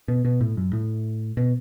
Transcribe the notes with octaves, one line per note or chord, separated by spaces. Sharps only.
B2
B2
A2
F#2
A2
B2